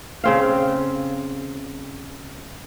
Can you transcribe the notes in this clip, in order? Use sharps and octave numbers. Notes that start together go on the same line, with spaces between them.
C#3 C4 F5